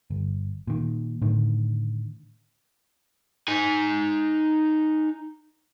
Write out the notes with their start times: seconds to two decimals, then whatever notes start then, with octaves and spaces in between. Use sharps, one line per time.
0.10 G1
0.67 A#2 D#3
1.22 A2 D3 D#3
3.48 D#4 G#5